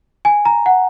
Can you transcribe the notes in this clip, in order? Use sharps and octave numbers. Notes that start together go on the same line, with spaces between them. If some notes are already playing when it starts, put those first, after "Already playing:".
G#5
A#5
F#5